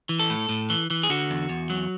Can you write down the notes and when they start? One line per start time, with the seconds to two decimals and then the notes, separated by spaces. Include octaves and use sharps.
0.09 E3
0.20 A4
0.30 A2
0.49 A2
0.70 E3
0.90 E3
1.03 G#4
1.10 D3 F#4
1.30 E2
1.49 E2
1.70 F#3